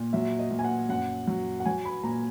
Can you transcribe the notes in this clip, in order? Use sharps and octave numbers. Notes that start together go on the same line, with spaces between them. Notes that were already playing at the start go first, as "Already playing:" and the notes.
Already playing: A#2
F#3 E5
D#5
A#2
G#5
F#5
F#2 F#5
F#3
F#5
F#3 G#5
B5
A#2 A#5